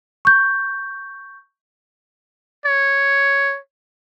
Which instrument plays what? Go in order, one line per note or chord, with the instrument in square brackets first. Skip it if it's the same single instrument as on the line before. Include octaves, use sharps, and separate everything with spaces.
[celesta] C#6 G6
[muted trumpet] C#5